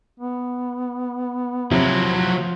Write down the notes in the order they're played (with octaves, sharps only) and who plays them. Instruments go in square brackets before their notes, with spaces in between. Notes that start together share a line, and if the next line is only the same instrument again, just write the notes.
[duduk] B3
[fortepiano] C3 [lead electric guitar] F3 [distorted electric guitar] F#3 E4